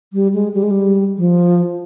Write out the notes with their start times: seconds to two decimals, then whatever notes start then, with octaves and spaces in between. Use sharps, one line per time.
0.13 G3
0.34 G#3
0.54 G3
0.63 G#3
0.71 G3
1.17 F3